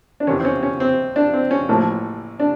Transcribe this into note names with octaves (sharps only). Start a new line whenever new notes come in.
D4
E2 C3 D#3 C#4
C4
C#4
C#4
C4
D4
C4
C#4
A1 A2 F3 A#3
D4